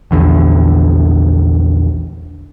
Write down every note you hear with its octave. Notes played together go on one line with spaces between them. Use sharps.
A#1 E2 D3